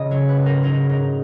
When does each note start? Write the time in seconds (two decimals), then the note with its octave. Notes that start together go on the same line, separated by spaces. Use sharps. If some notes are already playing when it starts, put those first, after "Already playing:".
Already playing: C#3 D#5
0.11 F#3 C#5
0.29 B4
0.37 G#2
0.46 A#4
0.63 F#3 D#4
0.89 G#2 D#4